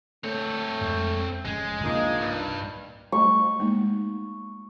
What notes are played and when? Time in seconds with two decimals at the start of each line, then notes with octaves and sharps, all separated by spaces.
0.24 A3 C4 C#5
0.81 F2 G#3
1.45 F1 C#3 G#3 C#4
1.84 C2 F3 A#3 D4 D#4
2.21 G2
3.12 G3 A3 D#5 C#6
3.60 G#3 A#3 D#4